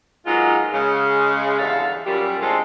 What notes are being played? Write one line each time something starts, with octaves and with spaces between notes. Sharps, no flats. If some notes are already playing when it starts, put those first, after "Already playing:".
F#3 G#3 A#3 B3 D#4 F4
C#3 G#3
E2 G2 D3 A4 F5
F#2 A#2 G3
D2 G#3 C4 F4 A4